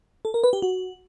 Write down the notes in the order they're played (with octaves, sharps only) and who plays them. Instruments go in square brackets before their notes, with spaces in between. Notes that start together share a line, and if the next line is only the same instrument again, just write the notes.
[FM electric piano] A4
A#4
B4
G4
F#4